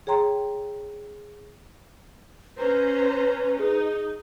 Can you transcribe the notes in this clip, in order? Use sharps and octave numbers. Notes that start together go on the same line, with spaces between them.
G#4 C#5 G5 A#5 C6
C#4 B4 C5 A#5
D#4 G#4